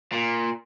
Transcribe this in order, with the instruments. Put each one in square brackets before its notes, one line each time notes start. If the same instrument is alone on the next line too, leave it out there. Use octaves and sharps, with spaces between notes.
[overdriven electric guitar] A#2